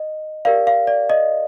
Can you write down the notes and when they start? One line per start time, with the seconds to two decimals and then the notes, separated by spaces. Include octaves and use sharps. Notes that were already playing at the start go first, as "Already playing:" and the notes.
Already playing: D#5
0.45 G4 A#4 D5 F5
0.67 F5
0.87 D5
1.10 D#5